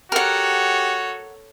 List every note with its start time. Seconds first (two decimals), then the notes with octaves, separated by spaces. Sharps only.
0.12 F#4 G4 A4 A#4 C#5 F#5